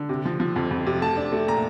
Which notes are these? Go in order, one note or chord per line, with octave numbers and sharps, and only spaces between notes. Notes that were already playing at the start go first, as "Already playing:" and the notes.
Already playing: D3
C3
F3
F3
F2
F2
C3
A3 A5
D4
A3
A#2 A#5